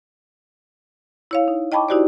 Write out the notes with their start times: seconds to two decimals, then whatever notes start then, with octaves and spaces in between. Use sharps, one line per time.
1.31 E4 C#5 F5
1.48 D#4
1.72 D#5 G5 A5 B5 C#6 D6
1.89 D#4 E4 F#4 G4 C5 D5